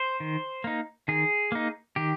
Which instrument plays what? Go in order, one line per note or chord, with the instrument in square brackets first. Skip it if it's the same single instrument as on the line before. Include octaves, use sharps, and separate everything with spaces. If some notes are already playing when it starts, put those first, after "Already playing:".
Already playing: [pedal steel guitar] C5
D#3
A#3 D#4
D#3 G#4
A#3 D#4
D#3 G4